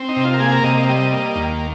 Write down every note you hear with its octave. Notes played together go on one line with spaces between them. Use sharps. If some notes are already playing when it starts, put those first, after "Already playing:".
Already playing: C4
D#4
C3
F4
A#4
A#3 G#4
A#4
C3 D#5
D#5
G3 D#5
A#3
D#2